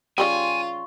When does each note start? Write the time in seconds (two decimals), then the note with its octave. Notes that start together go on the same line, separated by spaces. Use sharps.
0.18 C#3 G3 F4 G4 G#5 C6 C#6